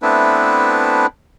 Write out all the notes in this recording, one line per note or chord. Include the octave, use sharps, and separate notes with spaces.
A3 B3 C4 D4 E4 B4